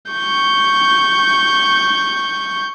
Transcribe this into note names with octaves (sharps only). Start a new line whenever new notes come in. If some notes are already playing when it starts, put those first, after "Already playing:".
C#6 G6